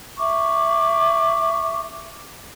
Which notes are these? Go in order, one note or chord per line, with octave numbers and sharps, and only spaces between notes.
E5 C#6 D6